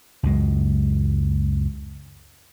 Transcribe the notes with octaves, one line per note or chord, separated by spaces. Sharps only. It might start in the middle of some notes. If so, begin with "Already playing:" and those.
C#2 F#2 G#3